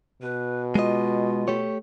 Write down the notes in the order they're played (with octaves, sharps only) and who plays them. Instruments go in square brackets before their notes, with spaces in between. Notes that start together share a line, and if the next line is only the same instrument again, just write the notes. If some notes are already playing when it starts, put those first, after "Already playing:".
[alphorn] B2 [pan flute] B4
[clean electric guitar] G#3 D#5 [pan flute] F4
[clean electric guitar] A3 G4 C#5